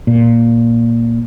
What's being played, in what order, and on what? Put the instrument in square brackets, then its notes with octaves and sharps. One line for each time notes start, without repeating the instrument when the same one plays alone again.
[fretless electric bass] A#2